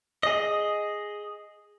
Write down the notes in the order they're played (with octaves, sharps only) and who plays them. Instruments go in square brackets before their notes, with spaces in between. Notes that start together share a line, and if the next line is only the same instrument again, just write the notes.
[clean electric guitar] G#4 D#5